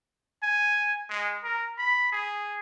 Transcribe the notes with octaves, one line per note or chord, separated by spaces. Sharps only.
G#5
G#3
A#4
B5
G#4